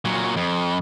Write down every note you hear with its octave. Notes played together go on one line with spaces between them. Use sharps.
A#2 F#3
F2